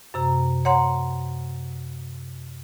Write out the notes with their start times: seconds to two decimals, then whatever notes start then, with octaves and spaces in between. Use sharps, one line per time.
0.14 F#2 C3 A#5
0.65 C#5 F#5 A#5 C6